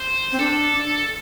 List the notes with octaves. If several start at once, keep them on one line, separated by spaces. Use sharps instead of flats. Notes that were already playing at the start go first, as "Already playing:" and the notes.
Already playing: C5
C4
D4 A4